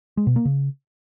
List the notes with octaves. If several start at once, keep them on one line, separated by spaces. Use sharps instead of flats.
G#3
B2
A#3
C#3